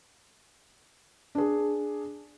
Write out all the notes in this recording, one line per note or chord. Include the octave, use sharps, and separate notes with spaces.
D4 G#4